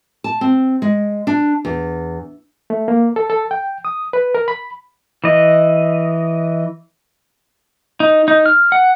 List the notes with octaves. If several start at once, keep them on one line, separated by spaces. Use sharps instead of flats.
A5
C4
G#3
D4
E2
A3
A#3
A4
A4
G5
D#6
B4
A#4
B5
E3 D#5
D#4
D#4
F6
F#5